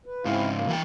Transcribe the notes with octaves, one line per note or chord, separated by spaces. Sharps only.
B4
G#2 C#3 C4 E4 F5
F#2 A#3
E3 F#5 G5